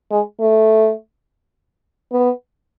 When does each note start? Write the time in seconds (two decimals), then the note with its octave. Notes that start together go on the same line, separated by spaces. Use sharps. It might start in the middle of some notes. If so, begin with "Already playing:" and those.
0.11 G#3
0.40 A3
2.12 B3